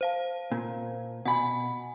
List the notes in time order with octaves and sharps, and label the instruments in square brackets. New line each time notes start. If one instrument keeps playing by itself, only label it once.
[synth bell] C5 F5 A5
[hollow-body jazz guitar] A#2
[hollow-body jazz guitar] B2 B5 [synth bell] F#5 G#5